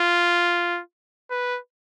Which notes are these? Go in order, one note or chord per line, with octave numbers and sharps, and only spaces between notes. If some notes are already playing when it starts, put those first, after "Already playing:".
Already playing: F4
B4